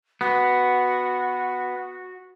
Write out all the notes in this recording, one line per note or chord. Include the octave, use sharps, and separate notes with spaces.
B3 F#4